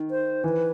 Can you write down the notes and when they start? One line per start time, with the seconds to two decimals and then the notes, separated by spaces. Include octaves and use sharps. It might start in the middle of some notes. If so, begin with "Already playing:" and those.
Already playing: D#3
0.11 C5
0.44 E3 B4